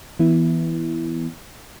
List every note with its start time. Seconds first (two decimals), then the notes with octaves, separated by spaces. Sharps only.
0.19 E3 B3 E4